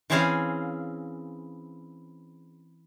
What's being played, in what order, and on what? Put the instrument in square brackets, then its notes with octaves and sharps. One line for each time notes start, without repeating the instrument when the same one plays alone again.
[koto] E3 C4 C#4 G#4 C5 F5